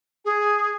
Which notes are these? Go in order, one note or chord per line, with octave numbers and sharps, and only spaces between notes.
G#4